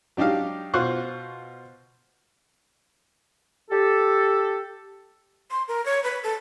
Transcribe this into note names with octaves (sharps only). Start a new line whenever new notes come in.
F#3 D4 D#4 G4 F5
B2 F4 C5 F5 C#6 F#6
G4 A4
C6
A#4
C#5
B4
A4